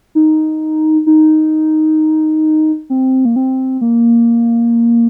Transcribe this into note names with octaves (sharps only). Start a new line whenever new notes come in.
D#4
D#4
C4
A#3
C4
A#3